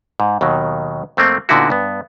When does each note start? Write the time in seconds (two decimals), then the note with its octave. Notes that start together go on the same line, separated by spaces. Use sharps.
0.20 G#2
0.41 D#2 B2 D#3 F#3
1.17 F2 A3 A#3 C4
1.49 A#2 D3 B3 D#4 E4 F#4
1.70 G2 B3